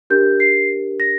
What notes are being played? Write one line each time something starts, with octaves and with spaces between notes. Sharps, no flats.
D4 G4 A#4 G6
C7
A#6